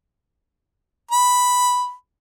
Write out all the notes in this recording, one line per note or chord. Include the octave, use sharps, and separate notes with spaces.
B5